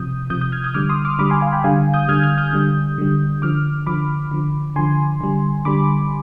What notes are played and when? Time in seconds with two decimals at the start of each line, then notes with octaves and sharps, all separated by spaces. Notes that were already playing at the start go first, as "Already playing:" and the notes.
Already playing: C3 F3 D#6 G6
0.30 C3 F3 D#6 G6
0.41 D#6 G6
0.52 F6 G#6
0.64 D#6 G6
0.74 D3 G3 D6 F6
0.89 C6 D#6
1.05 D6 F6
1.19 D3 G3 B5 D6
1.30 G#5 C6
1.41 F5 G#5
1.53 G5 B5
1.64 D3 G3 F5 G#5
1.94 D#6 G6
2.08 D3 G3 F6 G#6
2.23 F6 G#6
2.38 D#6 G6
2.53 D3 G3
2.98 D3 G3
3.42 D3 F3 D6 F6
3.86 D3 F3 B5 D6
4.31 D3 F3
4.76 D3 F3 G#5 C6
5.21 D3 G3
5.65 D3 G3 B5 D6